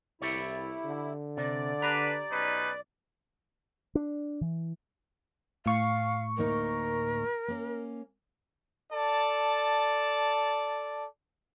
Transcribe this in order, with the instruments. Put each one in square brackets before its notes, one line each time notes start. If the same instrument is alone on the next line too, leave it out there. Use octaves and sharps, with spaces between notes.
[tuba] C2 [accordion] E4 [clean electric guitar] G4 A4 C#5
[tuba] D3
[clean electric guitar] C3 [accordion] D5
[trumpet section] D4 B4 [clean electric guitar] G4 A#5
[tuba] B1 [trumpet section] C#4 D#4 B4
[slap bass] D4
E3
[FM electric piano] A2 C#6 [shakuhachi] F5
[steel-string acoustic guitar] D2 A#3 D#4 [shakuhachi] A#4
[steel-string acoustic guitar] A#3 C#4
[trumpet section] A4 D5 A5